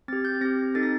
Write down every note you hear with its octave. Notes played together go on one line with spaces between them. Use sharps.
C4 G4 A6
G6
C4 G4 A#6
C4 D#4 A4 A6
A#6